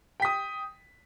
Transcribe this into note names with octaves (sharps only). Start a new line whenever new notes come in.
G5 D#6 B6